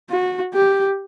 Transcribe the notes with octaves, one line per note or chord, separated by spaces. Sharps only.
F#4
G4